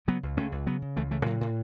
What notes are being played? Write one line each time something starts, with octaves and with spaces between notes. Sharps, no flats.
C#3 F#3 B3
C#2
C#2 A3 C#4
C#2
C#3 F#3 B3
C#3
C#2 E3 A3
C#3 E3 A3
A2 F#3
A2